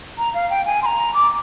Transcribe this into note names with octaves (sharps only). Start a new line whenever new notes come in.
A#5
F5
G5
G#5
C6
A#5
D6